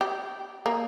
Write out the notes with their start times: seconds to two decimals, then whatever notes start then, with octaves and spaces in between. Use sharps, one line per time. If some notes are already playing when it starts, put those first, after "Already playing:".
0.01 G4
0.66 A#3